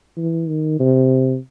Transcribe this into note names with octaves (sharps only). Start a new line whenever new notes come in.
E3
D#3
C3